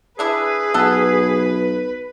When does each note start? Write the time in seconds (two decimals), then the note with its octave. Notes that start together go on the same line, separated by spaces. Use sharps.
0.19 D4 E4 G#4 B4 E5
0.74 B1 A4 F#5